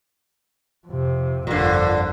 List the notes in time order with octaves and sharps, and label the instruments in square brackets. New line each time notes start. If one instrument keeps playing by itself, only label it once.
[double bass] F2 C3
[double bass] G1 F2 [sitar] A#2 D3